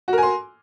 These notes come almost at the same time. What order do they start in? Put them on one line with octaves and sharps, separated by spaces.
F#4 A#4 G#5 C6